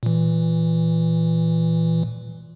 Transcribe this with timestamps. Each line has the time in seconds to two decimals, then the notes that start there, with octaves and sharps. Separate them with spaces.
0.03 A#2 E3